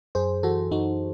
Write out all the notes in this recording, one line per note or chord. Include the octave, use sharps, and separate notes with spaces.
F#2 G#4 C5
E3 F#4 A4
F#2 D#4 F#4